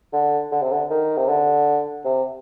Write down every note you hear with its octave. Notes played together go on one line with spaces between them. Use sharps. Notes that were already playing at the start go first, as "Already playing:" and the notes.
D3
D3
C3
D3
D#3
C3
D3
C3